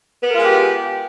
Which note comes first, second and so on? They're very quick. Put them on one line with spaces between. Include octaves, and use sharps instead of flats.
B3 A#4 F4 G#3 G4